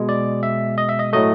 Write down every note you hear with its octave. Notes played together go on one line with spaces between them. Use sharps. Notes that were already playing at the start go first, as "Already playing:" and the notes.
Already playing: B2 G#3
D5
E5
D#5
E5
D#5
A2 F#3 A3 D#5